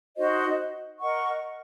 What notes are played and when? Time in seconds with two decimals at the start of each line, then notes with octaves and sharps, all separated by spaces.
0.16 D#4 F#4 C5 D#5
0.99 A#4 D#5 F#5 C#6